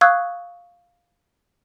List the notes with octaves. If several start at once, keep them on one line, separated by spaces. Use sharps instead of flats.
F5 C#6 D#6 E6 F#6 G#6